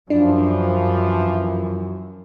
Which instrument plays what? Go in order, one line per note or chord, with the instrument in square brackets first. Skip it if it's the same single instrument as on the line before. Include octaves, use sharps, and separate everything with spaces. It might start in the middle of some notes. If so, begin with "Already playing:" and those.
[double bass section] F#2 [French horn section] E3 F3 [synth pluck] D4